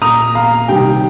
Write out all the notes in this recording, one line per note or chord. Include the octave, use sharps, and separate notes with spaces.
A#2 A#3 A#5 D#6
F5 A#5
C3 D#3 G3 G5